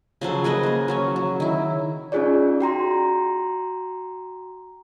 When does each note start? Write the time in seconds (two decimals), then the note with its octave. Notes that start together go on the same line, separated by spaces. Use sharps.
0.21 C#3 F3 F#3 A4
0.44 G#4 A#4 B4 D#5
0.63 A#3 D#5
0.88 F#3 C#4 C#5
1.16 F#3
1.40 D#3 E4
2.12 C#4 D#4 F4 G#4 C#5 D5
2.61 F#4 G5 A#5 C6